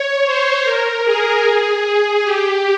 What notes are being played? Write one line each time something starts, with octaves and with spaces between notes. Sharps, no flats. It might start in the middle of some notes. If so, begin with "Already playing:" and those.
Already playing: C#5
C5
A#4
G#4
G4